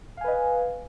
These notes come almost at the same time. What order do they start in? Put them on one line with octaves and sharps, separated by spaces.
F5 G#5 B4 D#5